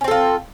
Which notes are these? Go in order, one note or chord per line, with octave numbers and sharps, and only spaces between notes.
C4 C#4 F4 A4